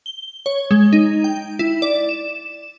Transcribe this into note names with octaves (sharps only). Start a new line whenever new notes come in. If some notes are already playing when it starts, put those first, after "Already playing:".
G7
C#5
G#3
D#4
G5
E4
D5
E7